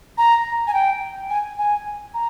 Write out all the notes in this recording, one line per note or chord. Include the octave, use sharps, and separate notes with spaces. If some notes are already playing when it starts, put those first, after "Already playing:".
A#5
G#5
G5
G#5
G#5
A#5